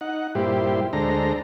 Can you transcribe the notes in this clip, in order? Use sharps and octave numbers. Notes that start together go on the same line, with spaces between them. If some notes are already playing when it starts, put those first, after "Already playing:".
D#4 F#5
G2 A#2 G3 E4 G4 C5
D2 G#3 D4 A4 C5 A#5